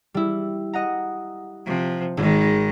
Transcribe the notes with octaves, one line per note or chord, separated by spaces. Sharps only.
G3 E4
D#5 F#5 A#5
C3 F3
G#1 D#3 G#3